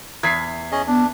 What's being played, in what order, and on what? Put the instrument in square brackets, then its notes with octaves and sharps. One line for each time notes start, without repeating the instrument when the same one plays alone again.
[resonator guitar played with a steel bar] E2 [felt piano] G#6 B6 C7
[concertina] C#4 G#4 D#5
[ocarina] B3 [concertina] D4